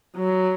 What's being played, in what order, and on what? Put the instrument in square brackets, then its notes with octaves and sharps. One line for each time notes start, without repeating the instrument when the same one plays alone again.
[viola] F#3